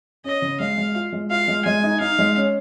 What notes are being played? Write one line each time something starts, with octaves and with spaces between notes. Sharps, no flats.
C#4 D#5
C#3
G#3 F5
G#3
F4
G#3
F4 F5
G#3
G#3 G#5
D#4
D#4 F5
G#3
C#4